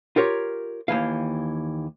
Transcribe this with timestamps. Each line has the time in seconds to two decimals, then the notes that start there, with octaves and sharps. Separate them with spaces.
0.16 F4 G4 A#4 C#5
0.88 D#2 C3 E3 F5